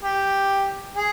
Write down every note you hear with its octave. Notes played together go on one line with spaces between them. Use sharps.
G4
G#4